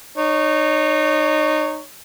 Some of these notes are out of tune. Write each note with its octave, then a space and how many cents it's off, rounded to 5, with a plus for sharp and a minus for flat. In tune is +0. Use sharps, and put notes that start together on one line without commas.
D#4 -25 C#5 +0